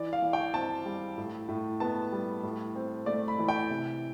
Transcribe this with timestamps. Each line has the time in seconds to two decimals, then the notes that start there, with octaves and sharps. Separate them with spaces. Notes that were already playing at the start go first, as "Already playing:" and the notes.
Already playing: E3 D5
0.13 F5
0.22 E3
0.33 G5
0.54 C4 A5
0.85 G3
1.18 A2
1.48 A2
1.80 B3 A5
2.12 G3
2.43 A2
2.75 C4
3.06 A3 D5
3.28 B5
3.39 E3
3.48 G5
3.70 C3